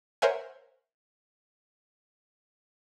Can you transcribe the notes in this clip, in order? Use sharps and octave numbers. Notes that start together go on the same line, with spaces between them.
A#4 C5 C#5 E5 F#5 G#5